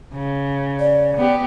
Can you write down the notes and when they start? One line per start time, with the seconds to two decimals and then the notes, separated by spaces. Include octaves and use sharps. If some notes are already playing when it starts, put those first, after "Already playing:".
0.14 C#3
0.79 D5
1.16 B3 G4